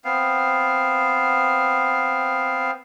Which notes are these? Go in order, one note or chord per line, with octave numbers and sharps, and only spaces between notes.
B3 C4 F5